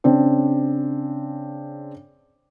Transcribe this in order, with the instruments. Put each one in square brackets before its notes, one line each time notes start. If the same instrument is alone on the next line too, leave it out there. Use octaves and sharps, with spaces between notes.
[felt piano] C#3 C4 D4